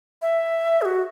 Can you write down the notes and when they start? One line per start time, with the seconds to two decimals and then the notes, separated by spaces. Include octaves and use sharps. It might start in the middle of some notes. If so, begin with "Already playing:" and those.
0.22 E5
0.82 G#4
0.85 F#4